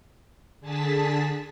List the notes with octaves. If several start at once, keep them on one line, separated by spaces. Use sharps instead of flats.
D3 G#4 A5 A6 B6